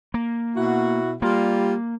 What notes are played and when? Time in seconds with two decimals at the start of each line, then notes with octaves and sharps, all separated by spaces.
0.14 A#3
0.57 B2 E4 F#4
1.22 G3 A#3 F4